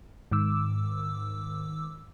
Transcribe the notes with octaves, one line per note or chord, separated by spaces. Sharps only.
G#2 D#3 D6 E6